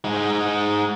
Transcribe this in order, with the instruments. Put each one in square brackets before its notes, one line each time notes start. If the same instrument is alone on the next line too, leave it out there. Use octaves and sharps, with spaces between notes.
[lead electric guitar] G#3 D#4